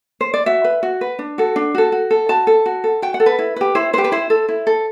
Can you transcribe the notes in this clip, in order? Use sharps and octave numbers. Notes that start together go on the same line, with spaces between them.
C5
D5
F#4 E5
B4
F#4
B4
D4
F#4 A4
D4
F#4 A4
F#4
A4
F#4 A5
A4
F#4
A4
F#4 G5
F#5
A4
B4
E4
G4 B4
E4 C5
G4 B4 C5
B4
E4 C5
A4
E4
A4